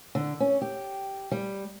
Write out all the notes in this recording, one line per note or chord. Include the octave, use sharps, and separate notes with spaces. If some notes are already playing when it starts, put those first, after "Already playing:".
D3
C#4
G4
G3